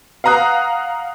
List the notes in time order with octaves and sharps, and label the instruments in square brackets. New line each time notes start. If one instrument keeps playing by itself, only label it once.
[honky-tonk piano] F5 F#5 A#5 D#6 F#6